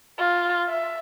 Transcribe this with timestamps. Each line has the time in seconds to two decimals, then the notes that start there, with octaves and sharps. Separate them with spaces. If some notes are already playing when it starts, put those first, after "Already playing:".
0.18 F4
0.69 E5